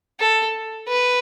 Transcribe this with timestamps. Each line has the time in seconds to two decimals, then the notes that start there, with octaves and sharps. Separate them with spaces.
0.20 A4
0.88 B4